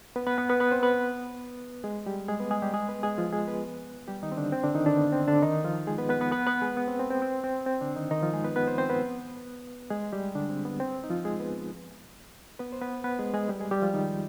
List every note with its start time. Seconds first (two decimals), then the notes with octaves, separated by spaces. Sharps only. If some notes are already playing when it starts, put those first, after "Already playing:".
0.16 B3 B4
0.27 B3 B4
0.38 B3 B4
0.49 B3 B4
0.60 B3 B4
0.71 C4 C5
0.83 B3 B4
1.84 G#3 G#4
2.06 G3 G4
2.28 G#3 G#4
2.40 B3 B4
2.51 G#3 G#4
2.62 G3 G4
2.73 G#3 G#4
2.89 B3 B4
3.03 G#3 G#4
3.18 F3 F4
3.33 G#3 G#4
3.48 B3 B4
4.08 G3 G4
4.23 D#3 D#4
4.32 C4
4.37 D3 D4
4.52 C4
4.64 D3 D4
4.75 D#3 D#4
4.86 D3 D4
4.97 B3
5.12 C4
5.28 D3 D4
5.42 D#3 D#4
5.64 F3 F4
5.87 G#3 G#4
5.98 B3 B4
6.09 B3 B4
6.21 B3 B4
6.32 B3 B4
6.47 B3 B4
6.62 G#3 G#4
6.77 B3
6.88 C4
6.99 C4
7.10 C4
7.22 C4
7.44 C4
7.66 C4
7.81 D3 D4
7.96 D#3 D#4
8.11 D#3 D#4
8.22 F3 F4
8.33 G#3 G#4
8.44 B3 B4
8.56 B3 B4
8.67 C4 C5
8.78 C4 C5
8.90 B3 B4
9.91 G#3 G#4
10.13 G3 G4
10.35 D3 D4
10.50 C4
10.65 B3
10.80 C4
11.04 D#4
11.10 F3 F4
11.25 G#3 G#4
11.40 B3 B4
12.59 B3 B4
12.72 C5
12.81 B3 B4
13.04 B3 B4
13.19 G#3 G#4
13.34 G#3 G#4
13.49 G3 G4
13.60 G#3 G#4
13.71 G3 G4
13.82 F3 F4
13.94 D#3 D#4